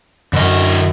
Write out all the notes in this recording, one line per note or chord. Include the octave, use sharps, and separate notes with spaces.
F#2 D3 D#5